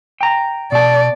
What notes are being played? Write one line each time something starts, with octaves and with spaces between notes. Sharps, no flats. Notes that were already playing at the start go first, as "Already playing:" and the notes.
G5 A#5
B2 D5 A5